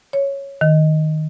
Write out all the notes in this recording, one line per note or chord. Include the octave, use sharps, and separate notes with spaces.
C#5
D#3